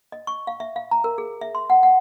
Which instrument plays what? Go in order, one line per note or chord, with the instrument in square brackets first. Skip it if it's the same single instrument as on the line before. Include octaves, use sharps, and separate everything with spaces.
[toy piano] D#5
C#6
F5
E5
F5
A#5
A#4
G#4
E5
C6
F#5
F#5